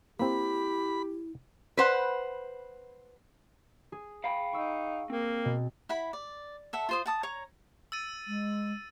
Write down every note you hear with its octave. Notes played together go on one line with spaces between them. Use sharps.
A#3 C4 E4 G4 B5
B4 C5 F#5
G#4
F5 G5 B5
D#4 C#6 E6
A#3 C4
B2
E4 F#5 B5
D5
A4 E5 F#5
F4 C5 D#6
F#5 A5 D#6
C#5 A#5
E6 A6 D#7
G#3